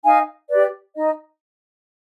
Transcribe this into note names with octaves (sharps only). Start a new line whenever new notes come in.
D#4 F5 G#5
G4 B4 D5
D#4 D#5